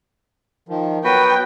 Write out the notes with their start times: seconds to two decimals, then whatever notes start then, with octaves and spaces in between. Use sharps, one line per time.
0.69 D#3 F3
1.04 F#3 B3 F#4 B4 G5